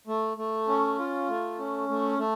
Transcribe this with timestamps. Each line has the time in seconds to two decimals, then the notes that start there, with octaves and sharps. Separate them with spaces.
0.07 A3
0.37 A3
0.68 C#4
0.98 F4
1.28 A3
1.59 C#4
1.89 A3
2.18 A3